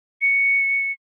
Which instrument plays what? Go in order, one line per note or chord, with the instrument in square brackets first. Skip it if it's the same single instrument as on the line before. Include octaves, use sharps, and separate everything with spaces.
[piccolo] C#7